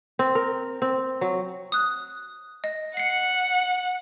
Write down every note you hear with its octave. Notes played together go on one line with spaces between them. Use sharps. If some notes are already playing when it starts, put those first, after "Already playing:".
C4
A#4
C4
F#3
D#6 F#6
D#5
F#5 C7 C#7